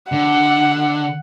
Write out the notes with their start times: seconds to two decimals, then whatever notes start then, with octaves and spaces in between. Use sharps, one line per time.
0.12 D3 F#5